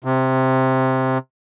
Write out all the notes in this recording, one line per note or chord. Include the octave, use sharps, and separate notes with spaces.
C3